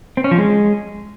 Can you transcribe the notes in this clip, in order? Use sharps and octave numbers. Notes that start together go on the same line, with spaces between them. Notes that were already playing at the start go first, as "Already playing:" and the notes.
C4
C#4
F3
G#3